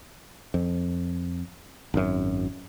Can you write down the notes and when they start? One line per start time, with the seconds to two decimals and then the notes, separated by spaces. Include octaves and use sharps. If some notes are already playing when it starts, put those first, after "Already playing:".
0.54 F2
1.94 G#1 F#2